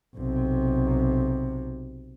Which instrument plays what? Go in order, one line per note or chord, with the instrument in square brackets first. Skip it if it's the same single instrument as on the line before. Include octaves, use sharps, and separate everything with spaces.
[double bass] B1 C3